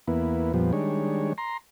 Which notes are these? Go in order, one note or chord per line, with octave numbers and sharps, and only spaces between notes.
E2 A#3 B3 E4
F2 A#2 F3 G3 B3
D#3 G3 G#3 D4 C#5
A#5 C6